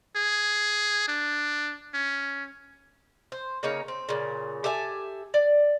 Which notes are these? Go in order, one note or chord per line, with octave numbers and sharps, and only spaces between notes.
G#4
D4
C#4
C5
C#3 A#3 D#4 C#5
C4
A#2 C#3
G4 A4 E5 G#5
D5